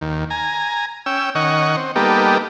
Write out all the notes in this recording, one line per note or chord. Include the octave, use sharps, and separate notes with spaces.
D#2
G#5 A#5
C#4 G5 E6
D#3 C#4 D#5 F#5 C#6
C4
G3 A#3 B3 D#4 G4 A4